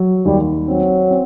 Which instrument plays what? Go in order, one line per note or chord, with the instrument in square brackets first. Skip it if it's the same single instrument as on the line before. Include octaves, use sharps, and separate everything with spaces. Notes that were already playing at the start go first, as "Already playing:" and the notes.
Already playing: [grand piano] F#3
[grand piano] D#2 [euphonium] G3
[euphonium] F#3 [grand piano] C4
[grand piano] C4